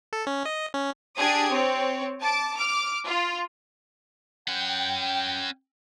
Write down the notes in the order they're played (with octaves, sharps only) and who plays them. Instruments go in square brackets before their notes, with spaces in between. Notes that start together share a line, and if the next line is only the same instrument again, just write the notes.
[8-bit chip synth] A4
C#4
D#5
C#4
[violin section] D4 G4 G#4 D#6 G#6
C4 C#5
A5 D6
D6 F6
F4
[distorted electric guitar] C#4 F#5 [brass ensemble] G5